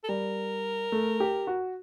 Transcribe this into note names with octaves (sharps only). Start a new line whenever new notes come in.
A4
G3 A#4
A3
G4
F#4